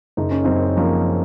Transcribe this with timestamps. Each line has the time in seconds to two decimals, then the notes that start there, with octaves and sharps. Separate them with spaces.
0.17 F#1 D#4
0.31 C#4
0.44 F#2 C4 D#4
0.76 F3 A#3 C#4